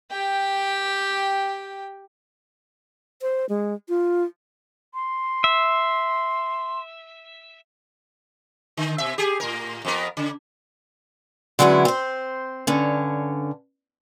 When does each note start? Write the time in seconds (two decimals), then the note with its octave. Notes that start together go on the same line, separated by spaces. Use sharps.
0.11 G4 G5
3.22 C5
3.49 G#3
3.89 F4
4.94 C6
5.44 E5
8.77 D3
8.98 B2 E5
9.18 G4 G#4
9.40 A2 A#4
9.85 F2 B3 A#4
10.17 C#3
11.59 D3 F#3 G#3 B3 C#4 E4
11.85 C4 C5
12.67 G2 D3 C#4